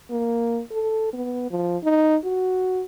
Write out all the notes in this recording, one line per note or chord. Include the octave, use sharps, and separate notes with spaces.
A#3
A4
B3
F3
D#4
F#4